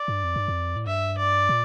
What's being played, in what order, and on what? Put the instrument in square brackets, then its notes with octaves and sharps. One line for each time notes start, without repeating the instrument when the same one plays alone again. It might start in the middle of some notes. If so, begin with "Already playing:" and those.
Already playing: [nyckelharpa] D5
[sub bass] G2
F2
G2
F2
A2
[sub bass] G2 [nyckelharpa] E5
[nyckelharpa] D5
[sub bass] A#2